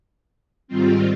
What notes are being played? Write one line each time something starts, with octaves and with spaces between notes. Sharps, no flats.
G#2 D#3 G3 C4 F4